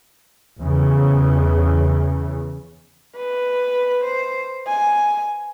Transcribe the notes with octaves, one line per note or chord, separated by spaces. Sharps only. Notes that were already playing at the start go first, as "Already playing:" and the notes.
E2 C#3
B4
C5
G#5